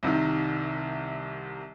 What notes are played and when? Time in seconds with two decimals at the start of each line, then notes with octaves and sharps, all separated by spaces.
0.03 C2 C3 D#3